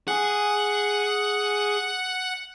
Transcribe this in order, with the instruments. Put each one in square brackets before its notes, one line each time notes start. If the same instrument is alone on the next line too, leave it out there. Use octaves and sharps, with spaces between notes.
[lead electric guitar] G#4 G#5 [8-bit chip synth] F#5